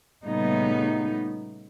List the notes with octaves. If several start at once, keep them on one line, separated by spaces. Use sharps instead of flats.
A#2 C#3 G3 A3 B3 D#4